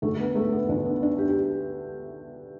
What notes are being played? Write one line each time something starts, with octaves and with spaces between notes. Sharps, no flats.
D2 D3 A3
B3
A3
B3
D2 D3 D4
B3
D4
G4
G4